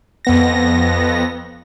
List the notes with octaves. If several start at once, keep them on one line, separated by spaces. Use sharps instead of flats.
F2 B3 A#6